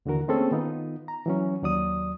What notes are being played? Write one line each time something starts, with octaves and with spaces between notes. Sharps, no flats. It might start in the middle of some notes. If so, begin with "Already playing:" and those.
D#2 D3 E3 F#4 A#4
A3 A#3 C4 C#4 G#4 A4
D#3 B3 D#4 F4
A#5
E3 F#3 C#4
D#2 F#3 D5 D#6